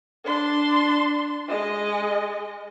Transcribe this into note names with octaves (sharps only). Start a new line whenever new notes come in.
D4 C6
G#3 D#5